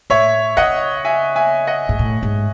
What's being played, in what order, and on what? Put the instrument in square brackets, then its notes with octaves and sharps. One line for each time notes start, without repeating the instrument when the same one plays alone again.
[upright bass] A2 [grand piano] C#5 E5
[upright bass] C#3 [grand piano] D#5 F#5
[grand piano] E5 G#5
E5 G#5
D#5 F#5
[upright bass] G#2
A2
G#2